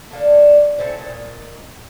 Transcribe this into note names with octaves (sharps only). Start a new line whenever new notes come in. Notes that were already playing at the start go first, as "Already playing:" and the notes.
A3 A#3 D4
A2 A3 C4 C#4
A#2 D#3